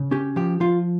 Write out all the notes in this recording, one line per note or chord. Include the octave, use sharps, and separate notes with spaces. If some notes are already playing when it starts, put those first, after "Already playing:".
Already playing: C#3
C#4 G4
F3 G4
F3 F4